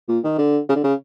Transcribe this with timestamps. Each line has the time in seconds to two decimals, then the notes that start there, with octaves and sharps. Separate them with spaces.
0.09 A#2
0.24 D#3
0.38 D3
0.69 C#3
0.75 D3
0.84 C#3